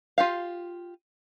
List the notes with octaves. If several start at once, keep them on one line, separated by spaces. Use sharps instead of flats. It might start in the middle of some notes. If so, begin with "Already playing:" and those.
F4 G4 F5